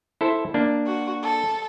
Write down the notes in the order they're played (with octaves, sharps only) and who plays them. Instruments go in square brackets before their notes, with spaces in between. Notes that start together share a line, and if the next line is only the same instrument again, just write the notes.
[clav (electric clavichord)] E4 A4 C5
A#3 D4
[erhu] F#4
A4